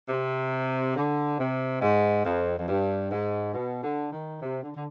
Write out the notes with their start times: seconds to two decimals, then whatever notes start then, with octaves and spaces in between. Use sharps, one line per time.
0.09 C3
0.96 D3
1.39 C3
1.81 G#2
2.25 F2
2.58 F2
2.68 G2
3.11 G#2
3.54 B2
3.83 D3
4.12 D#3
4.40 C3
4.62 D3
4.75 D3